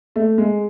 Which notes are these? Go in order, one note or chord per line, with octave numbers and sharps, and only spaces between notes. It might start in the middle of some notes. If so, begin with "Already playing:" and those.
A3
G#3